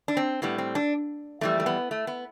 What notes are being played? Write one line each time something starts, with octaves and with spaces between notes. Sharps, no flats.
D4
C4
A2 G3 B3
C4
D4
F2 E3 G3 A3
A3
B3
A3
B3